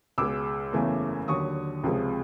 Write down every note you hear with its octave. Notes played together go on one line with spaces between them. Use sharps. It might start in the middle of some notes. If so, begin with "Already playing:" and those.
C#2 B2 G#3 D6 E6
F#1 E2 C#3 E3 A3
D#2 D3 F#3 C#6 D#6
C#2 C3 F3 G#3